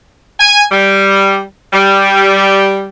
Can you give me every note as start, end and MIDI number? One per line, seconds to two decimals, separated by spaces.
0.39 0.63 80
0.71 1.41 55
1.72 2.87 55